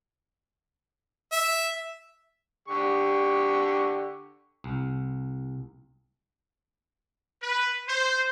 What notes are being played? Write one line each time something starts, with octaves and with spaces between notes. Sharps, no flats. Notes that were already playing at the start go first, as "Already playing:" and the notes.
E5
D3 G4 C#6
C2
B4
C5